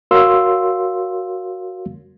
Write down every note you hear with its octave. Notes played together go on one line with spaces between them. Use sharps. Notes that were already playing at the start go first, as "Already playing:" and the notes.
F#4 A#4 C#5 F5 C6 E6